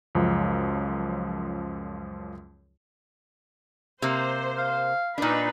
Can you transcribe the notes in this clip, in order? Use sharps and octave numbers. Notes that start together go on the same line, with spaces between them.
C#2 F#2 F3
C3 A#3 C5
F5
A#2 D4 D#4 B4